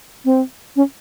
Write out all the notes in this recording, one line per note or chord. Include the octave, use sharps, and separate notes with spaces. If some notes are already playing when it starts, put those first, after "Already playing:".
C4
C#4